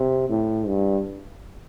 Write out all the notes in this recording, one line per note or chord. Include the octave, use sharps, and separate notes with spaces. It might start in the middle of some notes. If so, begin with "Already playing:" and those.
Already playing: C3
A2
G2